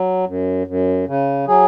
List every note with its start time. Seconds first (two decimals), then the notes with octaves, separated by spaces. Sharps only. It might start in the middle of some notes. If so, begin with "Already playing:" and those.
Already playing: F#3
0.27 F#2
0.67 F#2
1.07 C#3
1.47 F#3 G#4